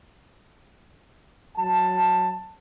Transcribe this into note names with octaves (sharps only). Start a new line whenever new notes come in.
F#3 A5